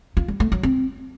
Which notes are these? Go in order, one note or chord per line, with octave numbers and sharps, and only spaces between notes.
F4
G3
A3
F#3
C4